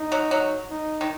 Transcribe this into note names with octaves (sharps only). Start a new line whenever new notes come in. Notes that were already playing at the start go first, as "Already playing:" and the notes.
Already playing: D#4
F#3
F#3
D#4
D#3